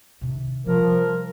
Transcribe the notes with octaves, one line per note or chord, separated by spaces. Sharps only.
C3 D#3
C3 F3 G3 A#4